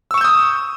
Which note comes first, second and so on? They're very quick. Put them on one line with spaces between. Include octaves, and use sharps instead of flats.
E6 C#6 E7 G6 D#6